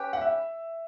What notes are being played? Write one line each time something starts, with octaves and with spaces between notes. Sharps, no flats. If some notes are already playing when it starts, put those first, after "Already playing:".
Already playing: C#4 G4 B4
F#5
E5